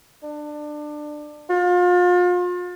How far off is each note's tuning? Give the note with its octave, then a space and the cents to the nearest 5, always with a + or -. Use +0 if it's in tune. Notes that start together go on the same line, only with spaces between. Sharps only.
D4 +25
F4 +35